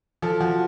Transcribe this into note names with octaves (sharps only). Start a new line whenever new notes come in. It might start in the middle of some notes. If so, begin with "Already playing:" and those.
F3 A4
F3 F#4